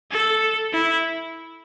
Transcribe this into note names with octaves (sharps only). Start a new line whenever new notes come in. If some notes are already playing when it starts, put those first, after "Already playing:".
A4
E4